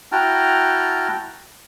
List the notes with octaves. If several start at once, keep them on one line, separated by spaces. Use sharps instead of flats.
E4 F#4 G5 A5 A#5 F6